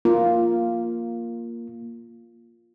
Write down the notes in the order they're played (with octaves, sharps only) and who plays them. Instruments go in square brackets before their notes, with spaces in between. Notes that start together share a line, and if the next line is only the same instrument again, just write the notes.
[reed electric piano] A#3 [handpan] F4